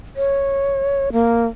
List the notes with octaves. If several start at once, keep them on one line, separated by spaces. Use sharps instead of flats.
C#5
A#3